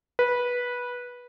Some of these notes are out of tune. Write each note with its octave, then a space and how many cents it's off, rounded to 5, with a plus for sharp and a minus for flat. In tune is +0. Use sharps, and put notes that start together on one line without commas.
B4 -15